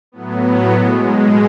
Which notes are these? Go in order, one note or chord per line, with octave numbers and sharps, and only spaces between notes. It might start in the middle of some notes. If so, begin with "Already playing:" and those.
A2 F#3 B3
B2 G#3